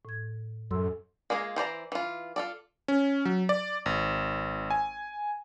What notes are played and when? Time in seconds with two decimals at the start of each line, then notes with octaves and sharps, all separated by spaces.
0.05 A2 G#6
0.71 F#2 A4 C6 E6
1.30 G#3 A#3 D4 F4 G#4
1.56 E3 C5 D5 A#5
1.92 E3 F4
2.36 F4 A4 D5
2.88 C#4
3.25 F#3
3.49 D5
3.86 G#1
4.70 G#5